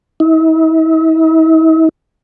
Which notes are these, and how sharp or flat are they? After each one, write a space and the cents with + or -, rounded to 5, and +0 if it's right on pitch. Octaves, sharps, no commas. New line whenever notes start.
E4 -45